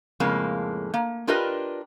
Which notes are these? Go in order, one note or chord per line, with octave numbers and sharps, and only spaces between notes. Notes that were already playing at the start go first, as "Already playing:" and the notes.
F2 A2 C#3 G#3 A#3
A#3
D4 F4 G4 A#4 B4 D#5